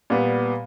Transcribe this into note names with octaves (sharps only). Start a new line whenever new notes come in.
A#2 G3 B3